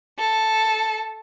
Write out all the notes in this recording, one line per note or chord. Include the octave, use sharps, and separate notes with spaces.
A4